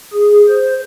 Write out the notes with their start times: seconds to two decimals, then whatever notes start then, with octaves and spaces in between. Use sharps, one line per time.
0.14 G#4
0.48 C5